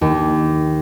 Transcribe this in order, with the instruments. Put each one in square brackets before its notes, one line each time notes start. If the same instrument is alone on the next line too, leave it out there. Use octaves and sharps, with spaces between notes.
[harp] D#2